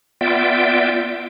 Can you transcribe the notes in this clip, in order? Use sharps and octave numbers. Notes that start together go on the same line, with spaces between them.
B3 F4 D5 E5 G5